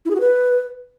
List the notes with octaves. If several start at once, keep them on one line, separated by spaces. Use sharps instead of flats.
E4
G#4
F#4
B4